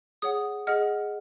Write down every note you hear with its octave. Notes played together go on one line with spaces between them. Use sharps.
G#4 C#5 F#5 D#6
G#4 D#5 F#5 F6